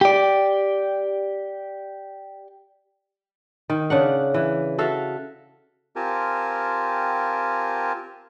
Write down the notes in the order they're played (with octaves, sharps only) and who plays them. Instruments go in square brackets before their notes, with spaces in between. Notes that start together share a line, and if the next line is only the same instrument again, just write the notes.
[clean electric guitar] G4 D5
[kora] D#3
C#3 D4 F#5
E3
F#4 A4 E5 F5
[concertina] C4 F4 G4 A#4 G#5 A5